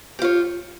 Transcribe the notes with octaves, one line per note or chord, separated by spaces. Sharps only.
F4 G4 C#5